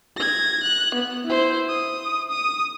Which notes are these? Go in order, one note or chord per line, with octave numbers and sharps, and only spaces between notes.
G#6 A#6
F#6
B3
E4 C5
D#6
D#6